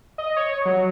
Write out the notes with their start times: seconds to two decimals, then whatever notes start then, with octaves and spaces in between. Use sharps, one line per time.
0.18 D#5
0.37 C#5
0.66 F#3